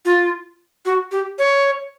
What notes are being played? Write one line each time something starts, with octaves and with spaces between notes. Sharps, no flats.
F4
F#4
G4
C#5